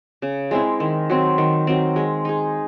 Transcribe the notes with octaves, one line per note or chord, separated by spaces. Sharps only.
C#3
G#3 C4 E4
D#3
F#3 C4
D#3
F#3 C4
G#3
D#4 G#4